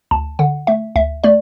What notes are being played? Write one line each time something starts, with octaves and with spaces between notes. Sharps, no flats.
D2 A5
D3 F#5
A3 E5
D2 E5
A3 D5